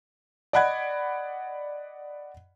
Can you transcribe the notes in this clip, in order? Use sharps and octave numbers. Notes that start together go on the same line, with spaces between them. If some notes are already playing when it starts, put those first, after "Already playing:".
D5 D#5 F#5 B5 F#6 G#6